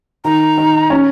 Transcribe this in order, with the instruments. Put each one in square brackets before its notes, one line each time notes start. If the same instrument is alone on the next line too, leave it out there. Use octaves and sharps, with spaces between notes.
[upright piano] D#3 [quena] A#5
[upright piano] D#3
C#4